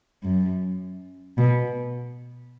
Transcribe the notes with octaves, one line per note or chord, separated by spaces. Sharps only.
F#2
B2